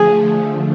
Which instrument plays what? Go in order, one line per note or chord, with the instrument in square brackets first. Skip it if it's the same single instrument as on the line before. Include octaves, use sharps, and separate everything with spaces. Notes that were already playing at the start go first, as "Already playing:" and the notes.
Already playing: [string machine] D3 F3 A3 [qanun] G#4